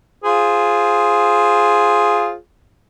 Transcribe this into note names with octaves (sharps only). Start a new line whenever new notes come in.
F4 G#4 C5